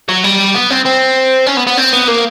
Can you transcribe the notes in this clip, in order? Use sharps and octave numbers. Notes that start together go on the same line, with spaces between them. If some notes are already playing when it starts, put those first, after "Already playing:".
F#3
G3
B3
C4
C4
C#4
B3
B3
C4
B3
A#3